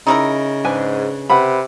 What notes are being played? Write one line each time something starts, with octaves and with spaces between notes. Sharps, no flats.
C#3 D#4 E4 A#4
G#2 D4 B4 G#5
C3 B4 F#5 B5